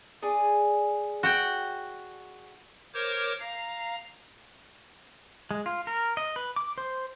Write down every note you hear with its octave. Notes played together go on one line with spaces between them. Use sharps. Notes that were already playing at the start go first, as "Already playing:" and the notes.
G#4 D5 G#5
F#4 F#5 G5
A#4 C5 C#5 D6
F5 A#5
G#3
F4
A#4
D#5
B4
D6
C5